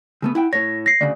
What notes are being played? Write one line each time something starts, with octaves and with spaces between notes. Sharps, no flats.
C#3 A3 B3
E4 F#5 G5
A2 C#5 A#6
A#6 C7
D2 C#3 D5